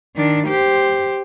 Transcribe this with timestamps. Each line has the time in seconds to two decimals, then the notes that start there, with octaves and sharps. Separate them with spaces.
0.16 D#3 D4
0.47 G4 C5